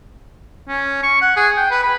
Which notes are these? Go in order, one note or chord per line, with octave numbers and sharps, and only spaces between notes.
C#4
C#6
F#5
G#4
G5
B4
B5